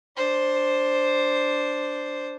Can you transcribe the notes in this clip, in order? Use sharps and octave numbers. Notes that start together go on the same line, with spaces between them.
D4 C5